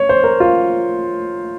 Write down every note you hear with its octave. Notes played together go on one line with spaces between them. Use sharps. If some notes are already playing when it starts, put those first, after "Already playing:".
Already playing: C#5
C5
A#4
F4